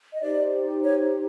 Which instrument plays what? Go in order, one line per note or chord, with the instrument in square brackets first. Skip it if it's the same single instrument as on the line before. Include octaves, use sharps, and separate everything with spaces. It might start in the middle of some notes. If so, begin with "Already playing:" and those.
[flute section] D#5
D#4 G4 C5 D5
C#5